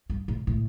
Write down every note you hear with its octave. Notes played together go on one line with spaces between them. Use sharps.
G2
A2
A2